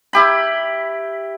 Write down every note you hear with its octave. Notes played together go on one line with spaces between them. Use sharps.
E4 G4 B5